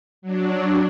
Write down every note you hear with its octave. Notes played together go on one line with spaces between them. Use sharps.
F#3 D4